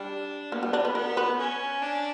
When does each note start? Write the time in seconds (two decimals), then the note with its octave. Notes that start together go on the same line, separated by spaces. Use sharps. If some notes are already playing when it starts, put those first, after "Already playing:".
Already playing: G3 D4
0.52 A#3 B3
0.63 G3
0.73 D4
0.85 B4
0.95 B3 A#4
1.17 B4
1.39 C#4
1.82 D4